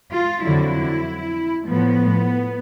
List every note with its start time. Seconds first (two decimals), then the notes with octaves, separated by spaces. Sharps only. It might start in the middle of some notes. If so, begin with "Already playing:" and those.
0.13 F4
0.43 F2 D3 F#3 E4
1.67 A2 F3 B3